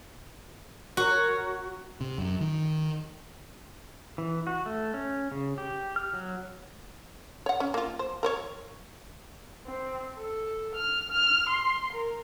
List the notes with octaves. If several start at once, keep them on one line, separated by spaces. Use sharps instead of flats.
F#4 A#4 C#5
C3
F#2
D#3
E3
F#4
A3
C#4
C#3
G4
F6
F#3
C#5 F#5
C#4
A#3 F4
C5
A#4 C5 C#5
C4
A4
F6
F6
C6
A#4